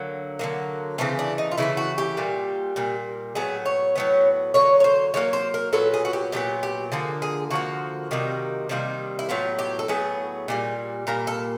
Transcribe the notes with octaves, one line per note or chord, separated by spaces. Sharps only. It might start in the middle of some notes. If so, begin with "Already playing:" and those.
Already playing: D3 F#3 A#3
D3 F#3 A#3
C#3 E3 A3 C4
D4
D#4
F4
C#3 E3 A3 E4
F#4
G4
A#2 G3 A#3
A#2 G3 A#3
A2 F#3 B3 G#4
C#5
A2 F#3 B3
D3 F#3 A#3 C#5
C#5
C5
D3 F#3 A#3 C#5
C5
A#4
A#2 F#3 B3 A4
G#4
F#4
G4
A#2 F#3 B3 G4
G4
D3 F3 A#3 G#4
G#4
D3 F3 A#3 F#4
C3 D#3 G3 A#3
C3 D#3 G3 A#3
E4
A2 F#3 B3 F4
G4
A4
A2 F#3 B3 G#4
A#2 G3 A#3
A#2 G3 A#3 A#4
A4